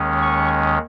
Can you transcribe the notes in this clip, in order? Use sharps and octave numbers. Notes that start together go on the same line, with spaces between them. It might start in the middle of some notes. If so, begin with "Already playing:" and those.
Already playing: D#2 D#3 G#3 C#4
C#6